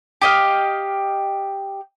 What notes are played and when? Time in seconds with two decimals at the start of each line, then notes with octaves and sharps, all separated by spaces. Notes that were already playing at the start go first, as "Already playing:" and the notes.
0.21 G4 D#5 F5